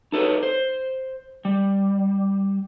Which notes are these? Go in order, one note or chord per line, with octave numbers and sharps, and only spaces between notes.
D#4 A4 B4 C#5
C5
G3